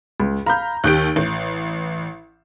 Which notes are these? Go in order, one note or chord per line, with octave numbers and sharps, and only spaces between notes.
C#2
F5 A#5 B5 G6
D#2 G4 F#6 G6 D7
A1